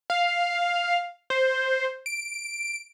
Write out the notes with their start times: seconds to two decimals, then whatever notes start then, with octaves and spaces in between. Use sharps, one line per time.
0.10 F5
1.30 C5
2.06 D7